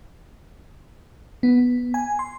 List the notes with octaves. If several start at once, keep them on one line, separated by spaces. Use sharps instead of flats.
B3
G#5
C6